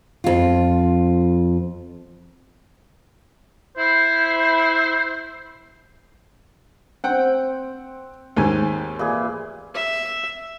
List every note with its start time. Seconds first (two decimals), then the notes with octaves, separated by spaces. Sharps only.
0.24 F2 F4
3.78 E4 C5
7.04 C4 F#5 G5
8.37 D#2 G#2 G#5
8.99 A#2 E3 G#4
9.74 E5